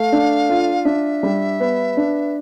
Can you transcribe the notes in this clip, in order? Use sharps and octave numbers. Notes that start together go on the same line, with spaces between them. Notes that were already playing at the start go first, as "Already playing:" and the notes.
Already playing: A3 F5
D4
F4
D4 E5
G3
B3
D4